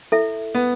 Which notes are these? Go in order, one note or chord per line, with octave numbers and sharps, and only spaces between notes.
E4 A4 E5
B3